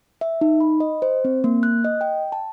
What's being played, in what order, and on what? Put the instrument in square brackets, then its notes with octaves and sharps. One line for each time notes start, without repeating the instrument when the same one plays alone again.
[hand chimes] E5
D#4
B5
D#5
C5
C4
A#3
F#6
D#5
G5
A5